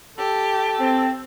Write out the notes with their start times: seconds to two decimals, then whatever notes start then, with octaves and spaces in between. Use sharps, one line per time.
0.18 G4 A4
0.80 C4